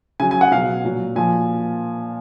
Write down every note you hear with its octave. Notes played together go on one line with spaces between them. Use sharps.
C#3 F#3 G#5
G#5
F#5
B2 F#3 F5
A#2 F#3
A#2 F3 G#5